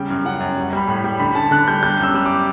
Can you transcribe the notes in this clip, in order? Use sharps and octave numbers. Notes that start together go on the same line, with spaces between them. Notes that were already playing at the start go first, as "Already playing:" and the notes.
Already playing: C#3 G3 G5
F#2
C#3 F#5
F#2
G3
G3 B5
A2
G3
D3 B5
D3 A5
D3 F#6
G3 G6
G3 G6
F#2 E6
G3
D6